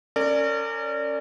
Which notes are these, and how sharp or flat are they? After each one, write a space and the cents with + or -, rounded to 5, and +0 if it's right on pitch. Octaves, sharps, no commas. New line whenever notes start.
C#4 -5 A#4 -35 D5 +5